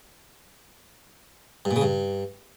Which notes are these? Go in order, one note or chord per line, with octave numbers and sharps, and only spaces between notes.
G2
A#2
C#3
G2